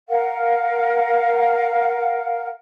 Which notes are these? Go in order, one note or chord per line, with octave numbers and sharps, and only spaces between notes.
A#4 F5 F#5